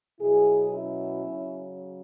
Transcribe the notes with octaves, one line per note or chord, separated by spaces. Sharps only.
B2 F#3 E4 G#4
C#4 E4
C#3 F#3